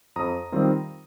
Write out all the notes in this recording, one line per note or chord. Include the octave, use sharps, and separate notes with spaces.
F2 A#5 D#6
D#3 G3 C4 F4